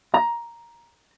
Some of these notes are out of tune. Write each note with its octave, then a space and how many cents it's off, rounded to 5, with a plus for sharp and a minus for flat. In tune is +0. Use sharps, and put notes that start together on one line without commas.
A#5 +10